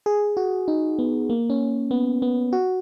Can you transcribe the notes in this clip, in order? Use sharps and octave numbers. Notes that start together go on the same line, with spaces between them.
G#4
F#4
D#4
B3
A#3
C#4
B3
B3
F#4